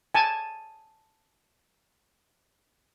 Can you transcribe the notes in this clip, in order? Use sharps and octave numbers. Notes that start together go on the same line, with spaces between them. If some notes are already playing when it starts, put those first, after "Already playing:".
G#5 A5